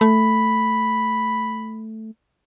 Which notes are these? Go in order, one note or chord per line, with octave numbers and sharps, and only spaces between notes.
A3 B5